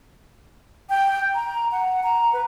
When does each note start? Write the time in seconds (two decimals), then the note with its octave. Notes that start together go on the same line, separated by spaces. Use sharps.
0.89 G5
1.35 A#5
1.72 F#5
2.03 A#5
2.33 B4